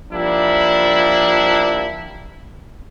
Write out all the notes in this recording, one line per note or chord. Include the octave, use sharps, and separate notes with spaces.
F3 G3 A#3 D4 E4